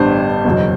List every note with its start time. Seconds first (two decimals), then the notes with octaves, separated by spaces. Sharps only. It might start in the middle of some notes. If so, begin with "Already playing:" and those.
Already playing: A1 G2 D3 G3 B3 C5
0.45 F#1 E2 B2 F#3